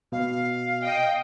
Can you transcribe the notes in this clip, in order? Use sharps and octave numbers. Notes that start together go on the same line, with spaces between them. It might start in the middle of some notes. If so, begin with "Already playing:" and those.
B2 F5
D#5 G5